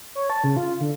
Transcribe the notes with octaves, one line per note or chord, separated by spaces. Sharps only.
C#5
A5
C#3
F4
D3